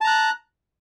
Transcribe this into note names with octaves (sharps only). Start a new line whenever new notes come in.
A5 A#5 F#6